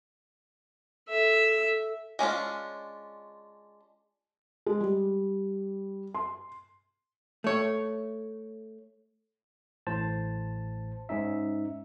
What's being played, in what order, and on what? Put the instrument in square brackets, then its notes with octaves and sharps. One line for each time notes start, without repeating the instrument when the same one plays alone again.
[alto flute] A4 [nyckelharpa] E5
[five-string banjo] G#3 C#4 D4 F4
[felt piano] G#3
G3
C6
[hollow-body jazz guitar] A3 C#5
[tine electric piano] A1 A2 C5 A5
G#2 C#4 D#4 E5